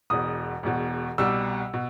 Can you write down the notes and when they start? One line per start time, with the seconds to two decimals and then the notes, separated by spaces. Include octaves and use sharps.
0.10 E1 E2 B2 D#6
0.63 E1 E2 B2
1.18 C2 B2 G3 E6
1.73 B2